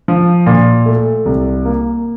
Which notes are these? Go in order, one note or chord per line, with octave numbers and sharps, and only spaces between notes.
F3
A#2
A3
C2
A#3